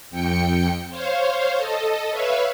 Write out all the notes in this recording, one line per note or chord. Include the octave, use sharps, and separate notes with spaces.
F2 G5 C#7
C5 C#5 F5
A4 D#5
B4 C#5 E5 F5